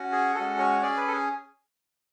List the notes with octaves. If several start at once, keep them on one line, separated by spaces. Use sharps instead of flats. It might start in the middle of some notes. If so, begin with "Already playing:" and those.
Already playing: C#4 F#4
G#4
G#3 C#4 F#4 A4
C#5
C#4 G#4 D5
B4
A4
G#4